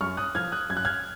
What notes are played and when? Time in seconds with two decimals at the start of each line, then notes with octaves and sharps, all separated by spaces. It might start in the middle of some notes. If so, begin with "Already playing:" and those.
0.01 F#2 C#6 F6
0.17 D#6 F#6
0.35 F3 F6 G#6
0.52 D#6 F#6
0.70 F#2 G#6
0.77 F#6
0.85 F6 G#6